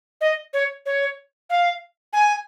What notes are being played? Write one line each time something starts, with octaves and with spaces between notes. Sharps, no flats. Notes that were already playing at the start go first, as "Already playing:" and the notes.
D#5
C#5
C#5
F5
G#5